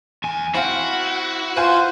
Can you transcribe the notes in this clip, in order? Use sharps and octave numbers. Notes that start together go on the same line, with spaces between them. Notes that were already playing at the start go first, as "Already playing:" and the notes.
E2 G#5
C4 E4 F#4 F5
F4 B4 C5 F5 G#5